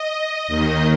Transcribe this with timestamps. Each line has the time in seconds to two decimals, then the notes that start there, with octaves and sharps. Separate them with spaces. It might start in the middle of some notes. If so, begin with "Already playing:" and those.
Already playing: D#5
0.48 D#2 D#3